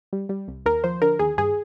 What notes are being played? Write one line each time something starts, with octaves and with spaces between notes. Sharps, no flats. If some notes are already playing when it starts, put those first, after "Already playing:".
G3
G3
C2
D#2 A#4
F3 C5
D3 A#4
D#2 G#4
G2 G#4